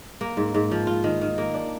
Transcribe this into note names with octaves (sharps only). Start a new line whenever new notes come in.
A#3
G#2
G#2
F3
F4
D#3
D#3
A#3
D4